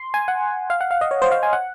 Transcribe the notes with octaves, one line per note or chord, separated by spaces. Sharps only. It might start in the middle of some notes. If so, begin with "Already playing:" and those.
Already playing: C6
G#5
F#5
F5
F#5
F5
D#5
C#5
C5
F5
G#5
F#5